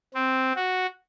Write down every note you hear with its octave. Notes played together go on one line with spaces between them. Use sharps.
C4
F#4